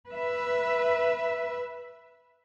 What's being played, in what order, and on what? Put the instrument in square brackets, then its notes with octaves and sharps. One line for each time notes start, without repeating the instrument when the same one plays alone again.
[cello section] B4 E5